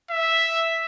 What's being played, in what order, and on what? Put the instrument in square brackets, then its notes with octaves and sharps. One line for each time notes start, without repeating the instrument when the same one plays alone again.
[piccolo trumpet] E5